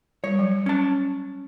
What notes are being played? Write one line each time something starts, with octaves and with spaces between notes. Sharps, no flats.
G3 C#5
F#3
C#4 A5